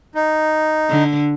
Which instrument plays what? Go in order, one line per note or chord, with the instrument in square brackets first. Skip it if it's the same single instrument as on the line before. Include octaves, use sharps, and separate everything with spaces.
[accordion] D#4
[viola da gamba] D3